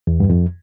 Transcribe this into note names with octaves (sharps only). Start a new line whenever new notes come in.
E2
G2
F2